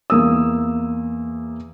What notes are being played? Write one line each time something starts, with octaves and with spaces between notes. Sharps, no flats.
E2 A#3 D#6 E6